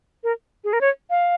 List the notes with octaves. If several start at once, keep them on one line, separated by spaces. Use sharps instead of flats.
A#4
G#4
A#4
C#5
F5